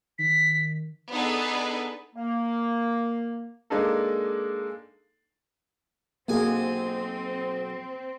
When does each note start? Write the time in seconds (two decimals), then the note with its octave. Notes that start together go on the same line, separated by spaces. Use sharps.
0.19 D#3 B6
1.12 B3 D4 D#4 G#4 A4 B4
2.16 A#3
3.70 G#3 A#3 D4 D#4 A4
6.28 B1 A#3 C4 G#4 G#5